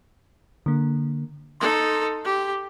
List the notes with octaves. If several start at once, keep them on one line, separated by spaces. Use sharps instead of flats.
D3 A#3
D#4 A4 C6
G4